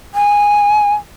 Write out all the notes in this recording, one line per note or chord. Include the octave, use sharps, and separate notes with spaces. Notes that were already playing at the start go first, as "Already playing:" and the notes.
G#5